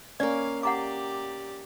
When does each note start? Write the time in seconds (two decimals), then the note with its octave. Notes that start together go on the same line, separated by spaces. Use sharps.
0.20 A#3 C#4 D5 F5
0.63 G4 D5 F#5 A#5 D6